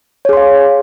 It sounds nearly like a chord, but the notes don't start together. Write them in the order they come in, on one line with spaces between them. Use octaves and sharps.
C#5 G#4 C6 F5